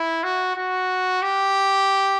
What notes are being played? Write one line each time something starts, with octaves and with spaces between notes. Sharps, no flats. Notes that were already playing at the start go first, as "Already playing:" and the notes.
Already playing: E4
F#4
F#4
G4